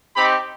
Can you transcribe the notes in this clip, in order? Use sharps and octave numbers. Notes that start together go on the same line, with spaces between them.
C4 D#4 G4 B5